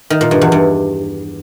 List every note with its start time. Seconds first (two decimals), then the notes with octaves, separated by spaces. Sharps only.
0.10 D#3
0.21 A#2
0.31 G2
0.41 E2
0.52 G2